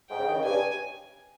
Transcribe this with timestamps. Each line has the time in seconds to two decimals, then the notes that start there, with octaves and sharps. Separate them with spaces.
0.10 G#2 G5
0.19 C#3
0.28 D#3
0.35 C#3
0.44 G2 G#5